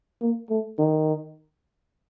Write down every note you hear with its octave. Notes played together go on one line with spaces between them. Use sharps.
A#3
A3
D#3